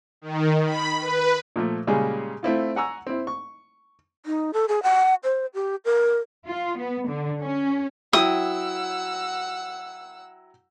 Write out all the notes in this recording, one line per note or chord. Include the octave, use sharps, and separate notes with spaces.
D#3
B5
B4
A#2 F3 A3
A#2 C#3 G3 G#3 G#4
A3 C4 E4 F4
F#5 G#5 A#5 C#6 E6
C4 E4
C#6
D#4
A4
G#4
F#5
C5
G4
A#4
F4
B3
D3
C#4
F#3 E4 F#5 G5 D#6 E6